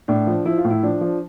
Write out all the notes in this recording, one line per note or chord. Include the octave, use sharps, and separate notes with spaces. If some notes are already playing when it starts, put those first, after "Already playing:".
A2 D4
F3
F3 E4
F4
A2
E4
F3 D4
F3